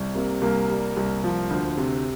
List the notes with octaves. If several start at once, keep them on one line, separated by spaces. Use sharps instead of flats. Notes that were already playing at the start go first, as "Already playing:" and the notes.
Already playing: C2
C3 A#3
C2 A#3
G3
C2
F3
D2
C3